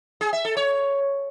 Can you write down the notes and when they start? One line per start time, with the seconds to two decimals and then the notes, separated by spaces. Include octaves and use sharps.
0.21 G#4
0.33 E5
0.45 A4
0.57 C#5